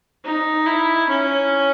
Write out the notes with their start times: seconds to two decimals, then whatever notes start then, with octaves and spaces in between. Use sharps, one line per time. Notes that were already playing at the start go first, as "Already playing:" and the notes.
0.25 D#4
0.67 E4
1.09 C#4